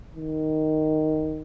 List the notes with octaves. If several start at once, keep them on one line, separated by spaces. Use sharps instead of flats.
D#3